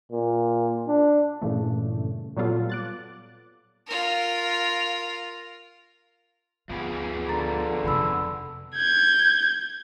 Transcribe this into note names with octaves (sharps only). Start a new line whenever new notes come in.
A#2
D4
G2 A#2 C#3 E3 A3
A#2 F#3 G3 B3 F4 A4
D6 F#6 A6
F4 A#4
D2 F3 B3 G#4
D3 A#5 A6
F2 C3 F#5 B5 E6
G6 G#6